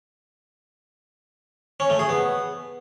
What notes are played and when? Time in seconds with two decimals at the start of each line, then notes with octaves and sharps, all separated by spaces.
1.80 C#4
1.90 A3
1.99 G#4
2.09 B3